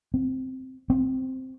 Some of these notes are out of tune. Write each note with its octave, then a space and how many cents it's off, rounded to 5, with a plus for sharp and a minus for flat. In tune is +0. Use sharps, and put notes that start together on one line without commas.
C4 -5
C4 -5